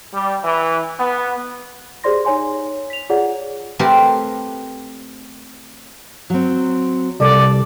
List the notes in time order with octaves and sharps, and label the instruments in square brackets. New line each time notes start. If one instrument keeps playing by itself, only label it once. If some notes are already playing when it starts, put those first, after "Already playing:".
[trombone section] G3
E3
B3
[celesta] G4 G#4 C5 D5 C6 A#6
D#4 C#5 G#5 C6
B6 F7
F4 G#4 C#5 D5 F#5
[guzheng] A3 C4 G4 A#4 B4
[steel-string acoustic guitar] F#3 C4
[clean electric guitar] C2 [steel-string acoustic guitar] A4 [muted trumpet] D5